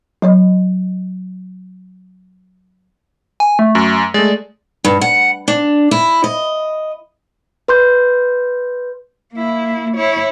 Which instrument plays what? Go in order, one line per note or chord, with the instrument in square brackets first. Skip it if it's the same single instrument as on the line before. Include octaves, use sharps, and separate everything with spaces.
[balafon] F#3 C#5 D#5
[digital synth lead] G#5
A3
[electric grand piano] F#2
[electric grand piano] G#3 A3 [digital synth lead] D5
[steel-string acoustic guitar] G2
F#5
D4
E4
D#5
[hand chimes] B4 C6 G6
[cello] A#3 E4
E4 C#5